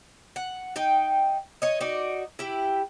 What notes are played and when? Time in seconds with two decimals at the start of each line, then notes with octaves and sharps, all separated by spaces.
0.36 F#5
0.76 D#4 G5
1.62 C#5 D#5
1.81 D#4 F#4 D5
2.39 E4 G4